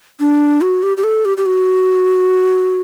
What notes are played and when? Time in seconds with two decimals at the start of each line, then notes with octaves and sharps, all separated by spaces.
0.20 D4
0.61 F#4
0.83 G4
0.97 G4
1.04 A4
1.25 G4
1.37 G4
1.46 F#4